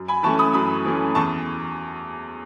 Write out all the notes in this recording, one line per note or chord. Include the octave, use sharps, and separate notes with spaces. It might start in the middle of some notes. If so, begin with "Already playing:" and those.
Already playing: F#2
G#5 B5
E3 A3 C#4 A5 C#6
B5 D#6
F#2 B5 D#6
E3 A3 C#4
E2 A5 C#6